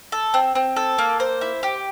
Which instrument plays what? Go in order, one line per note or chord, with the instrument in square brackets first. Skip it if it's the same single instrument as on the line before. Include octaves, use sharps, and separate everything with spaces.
[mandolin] A4
C4
C4
A4
A#3
C5
E4
G4